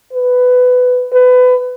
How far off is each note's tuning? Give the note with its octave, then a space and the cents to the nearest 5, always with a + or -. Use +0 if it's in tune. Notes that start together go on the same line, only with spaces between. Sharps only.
B4 +15
B4 +25